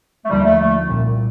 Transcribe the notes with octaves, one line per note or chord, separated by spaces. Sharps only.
A3
D#2 D3 F3 G3 A#3
A3
A3
C2 A#2 G3